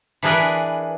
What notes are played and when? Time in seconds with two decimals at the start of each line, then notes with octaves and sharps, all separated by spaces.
0.23 E3 D4 G#4 A#4 B4